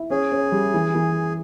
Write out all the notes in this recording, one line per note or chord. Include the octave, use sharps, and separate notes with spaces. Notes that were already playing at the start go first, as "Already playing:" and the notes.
Already playing: E4
C#4 G#4
C#4
G3
E3
E3